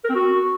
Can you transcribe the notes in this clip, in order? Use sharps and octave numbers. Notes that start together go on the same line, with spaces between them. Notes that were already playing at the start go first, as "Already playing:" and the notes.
A#4
C4
F#4